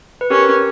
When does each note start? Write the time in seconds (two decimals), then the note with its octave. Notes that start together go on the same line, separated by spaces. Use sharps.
0.21 B4
0.30 C#4 G4 A#4